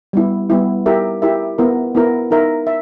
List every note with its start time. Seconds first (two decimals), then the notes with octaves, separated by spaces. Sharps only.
0.13 G3 B3 E4
0.50 G3 B3 E4
0.86 E4 G4 A#4 E5
1.22 E4 G4 A#4 E5
1.58 B3 E4 A#4
1.95 B3 E4 A#4
2.31 D#4 A#4 E5
2.67 E5